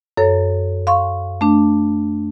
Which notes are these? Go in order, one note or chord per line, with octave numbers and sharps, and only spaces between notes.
F#2 A4 C#5
F5 C6 C#6
A3 D4